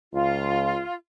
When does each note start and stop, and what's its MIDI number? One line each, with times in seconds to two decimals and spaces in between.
0.14 0.82 37
0.14 0.94 65